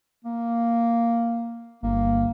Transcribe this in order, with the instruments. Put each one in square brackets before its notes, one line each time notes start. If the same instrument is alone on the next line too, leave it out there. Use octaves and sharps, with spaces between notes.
[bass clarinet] A#3
[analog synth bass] G1 [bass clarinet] A#3